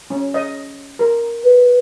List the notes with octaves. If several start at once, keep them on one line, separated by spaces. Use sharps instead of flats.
C#4
D#5
A#4
B4